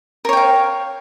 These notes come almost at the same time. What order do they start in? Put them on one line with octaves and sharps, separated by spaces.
A#4 C#5 G5 F5